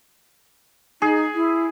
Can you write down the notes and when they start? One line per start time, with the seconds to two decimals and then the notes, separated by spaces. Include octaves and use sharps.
1.02 D#4 G#4
1.35 E4